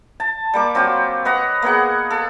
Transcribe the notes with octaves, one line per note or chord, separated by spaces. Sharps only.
A5
G3 A#3 D6
F#3 C4 F4 G4
B4 D#5 F#5 A#5
A#3 B3 G#4 F#5
A4